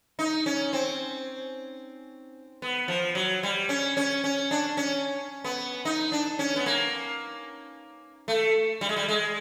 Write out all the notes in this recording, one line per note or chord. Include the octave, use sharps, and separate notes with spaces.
D#4
C#4
C4
B3
F3
F#3
G3
C#4
C#4
C#4
D4
C#4
B3
D#4
D4
C#4
B3
A#3
A3
G3
G#3
G3
G#3